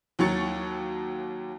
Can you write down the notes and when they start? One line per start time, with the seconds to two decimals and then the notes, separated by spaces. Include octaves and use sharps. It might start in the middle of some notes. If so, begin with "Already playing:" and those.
0.19 D#2 F#3 C#6 A6 C#7